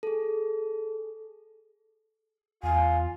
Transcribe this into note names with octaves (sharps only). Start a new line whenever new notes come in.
G#4 A4
E2 F4 G#5